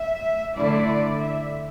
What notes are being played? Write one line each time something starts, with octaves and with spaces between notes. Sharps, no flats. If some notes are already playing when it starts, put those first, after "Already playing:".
Already playing: E5
D3 A3 E4 D5
E5